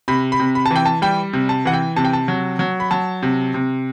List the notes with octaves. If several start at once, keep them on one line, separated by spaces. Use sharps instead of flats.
C3 B5
B5
C3
B5
A5
E3
G5
A5
G3 G5
C3
A5
E3 F#5
G5
C3 A5
G5
A5
F#3
F#3
B5
F#3 A5
C3
C3